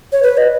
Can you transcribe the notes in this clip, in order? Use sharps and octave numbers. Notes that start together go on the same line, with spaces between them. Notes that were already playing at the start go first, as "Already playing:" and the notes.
C#5
B4
D#5